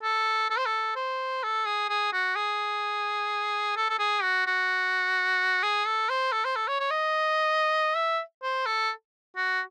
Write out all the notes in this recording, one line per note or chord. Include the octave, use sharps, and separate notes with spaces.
A4
A4
C5
A4
C5
A4
G#4
G#4
F#4
G#4
A4
A4
G#4
F#4
F#4
G#4
A4
C5
A4
C5
A4
C#5
C#5
D#5
E5
C5
A4
F#4